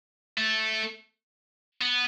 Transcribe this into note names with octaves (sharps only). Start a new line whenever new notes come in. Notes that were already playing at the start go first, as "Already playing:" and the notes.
A3
B3